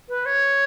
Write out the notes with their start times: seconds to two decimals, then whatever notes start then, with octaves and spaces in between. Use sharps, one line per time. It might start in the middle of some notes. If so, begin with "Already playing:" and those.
0.09 B4
0.26 C#5